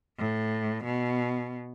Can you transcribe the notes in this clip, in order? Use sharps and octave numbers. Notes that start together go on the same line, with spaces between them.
A2
B2